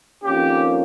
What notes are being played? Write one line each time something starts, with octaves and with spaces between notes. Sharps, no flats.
F2 D#3 A#3 C#4 G4